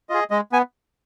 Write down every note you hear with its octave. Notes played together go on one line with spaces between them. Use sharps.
F4 G#4 D#5
G#3 D#5
B3 G#5